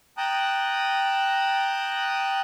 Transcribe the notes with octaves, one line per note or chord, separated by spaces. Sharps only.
G5 A5 A#5 D#6 F#6